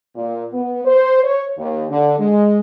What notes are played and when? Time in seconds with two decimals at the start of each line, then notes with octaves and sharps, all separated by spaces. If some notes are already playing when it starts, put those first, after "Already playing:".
0.15 A#2
0.53 B3
0.85 C5
1.23 C#5
1.58 D#2
1.89 D3
2.18 G#3